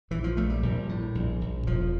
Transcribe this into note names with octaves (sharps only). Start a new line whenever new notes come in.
A#1 E3
F3
A#1 A3
G3
A#1
A2
A#1
A#1
E1 F3